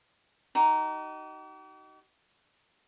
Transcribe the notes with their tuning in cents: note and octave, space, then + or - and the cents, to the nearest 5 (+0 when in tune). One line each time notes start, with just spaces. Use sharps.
D#4 +0 G4 -45 C#6 +40